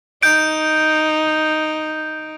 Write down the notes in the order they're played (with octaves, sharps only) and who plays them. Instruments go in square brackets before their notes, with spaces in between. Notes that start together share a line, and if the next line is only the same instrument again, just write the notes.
[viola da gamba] D#4 [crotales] G6 D7